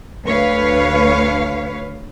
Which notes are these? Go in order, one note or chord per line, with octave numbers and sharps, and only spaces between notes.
D2 B4 C#5 F5